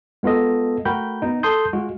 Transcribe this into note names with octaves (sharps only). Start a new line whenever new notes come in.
G#3 B3 F4 A4 D#5
A3 F#4 A#4 G5 B5 G6
B3 D#4
A4 A5 C6 D#6 G6
G#3 F4 F#4